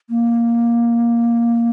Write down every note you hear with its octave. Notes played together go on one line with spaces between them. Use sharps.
A#3